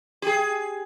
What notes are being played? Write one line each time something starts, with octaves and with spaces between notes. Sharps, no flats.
G4 G#4